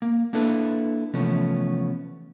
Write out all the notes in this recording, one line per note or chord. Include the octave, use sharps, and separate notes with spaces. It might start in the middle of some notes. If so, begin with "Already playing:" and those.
A#3
A#3 D4 E4 A4 B4
C3 E3 F3 A3 B3 C#4